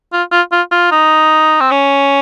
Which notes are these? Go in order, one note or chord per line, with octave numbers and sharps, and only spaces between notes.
F4
F4
F4
F4
D#4
C4
C#4